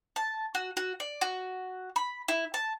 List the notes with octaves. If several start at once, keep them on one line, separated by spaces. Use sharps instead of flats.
A5
F#4
F#4
D5
F#4
B5
E4
A5